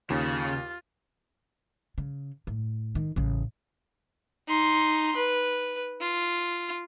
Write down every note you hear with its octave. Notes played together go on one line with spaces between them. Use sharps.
D#2 C#3 F4
C#3
A2
D#3
A1 C#3
D#4 C6
B4
F4